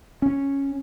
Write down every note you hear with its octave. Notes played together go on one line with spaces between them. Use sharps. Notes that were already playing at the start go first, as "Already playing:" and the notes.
C#4